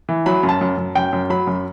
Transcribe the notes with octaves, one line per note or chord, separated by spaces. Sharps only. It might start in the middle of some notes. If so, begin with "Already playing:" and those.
E3
F#3 B5
F#2
A5
F#2
F#2
F#2 G5
F#2
F#3 B5
F#2